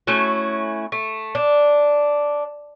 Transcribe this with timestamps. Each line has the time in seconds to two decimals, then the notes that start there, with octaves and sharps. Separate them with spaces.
0.07 A3 C#4 E4 F#4
0.92 A3
1.35 D4